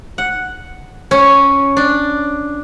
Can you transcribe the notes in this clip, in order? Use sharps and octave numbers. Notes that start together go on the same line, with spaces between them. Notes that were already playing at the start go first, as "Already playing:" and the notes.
F#5
C#4
D4